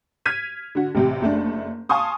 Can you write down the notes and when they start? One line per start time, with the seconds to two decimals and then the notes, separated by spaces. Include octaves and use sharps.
0.26 F6 G#6 B6 D#7
0.75 D3 F#4
0.95 A1 C3 G4
1.22 F#1 A3 D4
1.89 F5 G#5 A5 C6 C#6 D#6